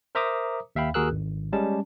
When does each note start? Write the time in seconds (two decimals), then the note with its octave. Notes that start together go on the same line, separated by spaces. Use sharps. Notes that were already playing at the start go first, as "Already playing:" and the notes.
0.15 A#4 C5 E5 A#5 D6 D#6
0.76 D#2 E5 F5 G5 B5
0.94 D#2 F#4 G#4 A#4 E6 F#6
1.11 G#1
1.53 G3 G#3 C#4 A5